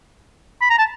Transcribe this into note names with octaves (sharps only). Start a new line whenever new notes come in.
B5
A#5
A5